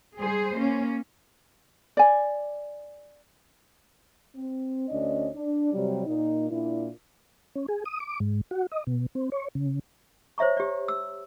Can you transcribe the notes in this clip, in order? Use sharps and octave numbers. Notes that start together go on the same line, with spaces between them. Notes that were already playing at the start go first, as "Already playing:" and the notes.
G3 G#4 C5
A#3 C#4
D5 G#5
C4
D2 C#4 D4 D#5
D4
C3 F#3 G3
A#2 D#4
A#2 D4 E4
C#4
G#4
D#6
D6
G#2
F#4
D#5
B2
C4
C#5
C#3
C5 C#5 E5 A#5 C#6
G4 D5
E6